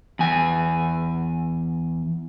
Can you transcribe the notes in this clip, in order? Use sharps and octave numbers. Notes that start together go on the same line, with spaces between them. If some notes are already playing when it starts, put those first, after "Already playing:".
E2 G#5